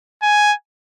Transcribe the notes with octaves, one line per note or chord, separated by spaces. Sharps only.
G#5